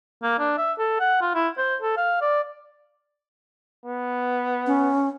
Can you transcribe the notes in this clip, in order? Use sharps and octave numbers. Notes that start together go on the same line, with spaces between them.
A#3
D4
E5
A4
F#5
F4
E4
C5
A4
F5
D5
B3
C#4